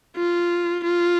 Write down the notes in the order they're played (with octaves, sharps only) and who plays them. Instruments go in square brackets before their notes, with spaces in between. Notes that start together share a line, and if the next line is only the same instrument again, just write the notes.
[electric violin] F4
F4